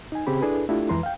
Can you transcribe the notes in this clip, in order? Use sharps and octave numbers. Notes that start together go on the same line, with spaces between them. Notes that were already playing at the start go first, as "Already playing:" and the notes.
D#4 G#5
C#3 C4 G4 G#4 B5
D4 E4 G#4 A4 B4
A3 D4 E4 F4 G4 A4
F2 E3 G#3 B4 A#5 C6
F5 G5